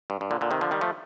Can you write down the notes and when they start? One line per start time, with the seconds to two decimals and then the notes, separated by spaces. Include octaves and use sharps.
0.10 G2
0.21 G2
0.31 A#2 D3
0.41 A#2 D3
0.51 C3 D#3
0.61 D3 F3
0.71 D#3 G3
0.81 F3 A3